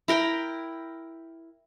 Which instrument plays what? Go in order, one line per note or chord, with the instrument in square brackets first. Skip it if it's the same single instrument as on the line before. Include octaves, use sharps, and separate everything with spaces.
[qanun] E4 A#4 G5 A#5